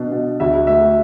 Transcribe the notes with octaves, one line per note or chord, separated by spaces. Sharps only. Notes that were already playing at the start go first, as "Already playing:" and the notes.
Already playing: B2 D4
B2
D2 E5
A3 E5